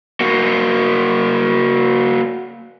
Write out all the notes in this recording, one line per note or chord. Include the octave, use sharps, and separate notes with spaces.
A#3 F#4